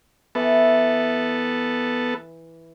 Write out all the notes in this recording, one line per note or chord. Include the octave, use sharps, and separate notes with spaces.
E3 B3 A4